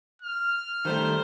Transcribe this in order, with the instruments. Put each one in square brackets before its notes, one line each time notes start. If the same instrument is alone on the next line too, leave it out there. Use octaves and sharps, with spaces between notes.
[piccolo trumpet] F6
[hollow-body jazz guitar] D#3 G3 A3 [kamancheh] C5